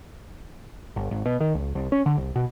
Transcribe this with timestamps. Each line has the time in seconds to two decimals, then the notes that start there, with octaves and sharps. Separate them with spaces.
0.96 G1
1.11 G#1
1.26 B2
1.41 D#3
1.54 C#2
1.75 C2
1.92 C#4
2.06 D3
2.17 C2
2.36 B2